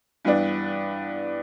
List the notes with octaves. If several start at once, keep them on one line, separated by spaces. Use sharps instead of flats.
G2 E3 B3 D4